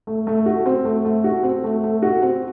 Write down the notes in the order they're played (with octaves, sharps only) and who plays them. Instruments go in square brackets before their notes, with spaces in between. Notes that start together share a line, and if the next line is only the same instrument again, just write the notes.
[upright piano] A3
A3
F#4
C4
A3
A3
F#4
C4
A3
A3
F#4
C4